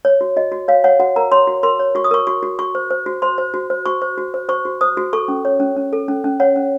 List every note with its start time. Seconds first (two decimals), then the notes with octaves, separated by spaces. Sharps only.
0.05 C#5
0.21 F#4
0.36 F#4 D#5
0.52 F#4
0.68 C#5 F5
0.84 C#5 F#5
0.99 F#4 F#5
1.16 A#4 A#5
1.32 C#5 C6
1.47 F#4
1.63 A#4 C6
1.79 C#5
1.95 F#4 C#6
2.04 D#6
2.11 A#4 C#6
2.27 F#4 C#6
2.43 F#4
2.59 F#4 C#6
2.75 C5
2.90 C5
3.06 F#4
3.22 C5 C6
3.38 C5
3.54 F#4
3.70 C5
3.86 F#4 C#6
4.02 C5
4.18 F#4
4.34 C5
4.49 C5 C#6
4.65 F#4
4.81 C5 D#6
4.97 F#4
5.13 A4 C#6
5.28 C#4
5.45 C#5
5.60 C#4
5.77 C#4
5.93 A4
6.08 C#4
6.24 C#4
6.40 C#5 F#5
6.56 C#4